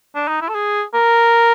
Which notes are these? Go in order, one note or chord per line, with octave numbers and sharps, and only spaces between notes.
D4
D#4
E4
A4
G#4
A#4